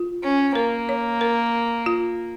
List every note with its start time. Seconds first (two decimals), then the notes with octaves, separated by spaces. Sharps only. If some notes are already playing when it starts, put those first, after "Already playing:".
Already playing: F4
0.23 C#4
0.55 A#3 A#4
0.89 C#5
1.21 A#4
1.86 F4